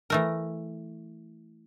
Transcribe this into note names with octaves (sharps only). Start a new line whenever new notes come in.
E3 A3 A#4